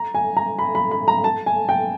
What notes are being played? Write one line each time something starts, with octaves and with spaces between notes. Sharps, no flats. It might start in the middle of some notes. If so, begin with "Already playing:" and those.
Already playing: A#5
G#5
A#5
B5
B5
B5
A#5
A5
G#5
G5